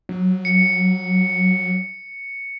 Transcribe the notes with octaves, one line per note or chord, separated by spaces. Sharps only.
F#3
C#7